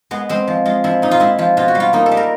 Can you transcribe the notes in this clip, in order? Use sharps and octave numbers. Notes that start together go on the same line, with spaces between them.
G#3 B3
G#3 C4
F3
G#3 F4
F3 E4
A#2 D#4
F4
G#3 E4
F3 F4
B2 F4
F#4
G3
F4
A#3 D#4
A4
G3
A#4